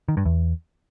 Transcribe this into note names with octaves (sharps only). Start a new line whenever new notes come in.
D#3
G2
E2